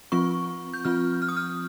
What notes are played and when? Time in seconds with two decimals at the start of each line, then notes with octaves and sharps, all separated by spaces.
0.12 F3 C4 F4 C#6
0.74 G6
0.85 F3 C4 F4 F6
1.22 F6
1.29 D#6
1.37 F6